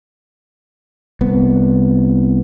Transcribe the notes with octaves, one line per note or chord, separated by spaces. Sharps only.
C2 B3